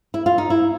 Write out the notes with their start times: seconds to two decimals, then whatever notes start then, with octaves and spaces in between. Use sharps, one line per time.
0.14 E4
0.26 F4
0.38 D#4
0.50 E4